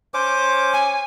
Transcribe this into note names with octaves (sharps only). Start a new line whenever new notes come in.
C#4 C5 D6
G#5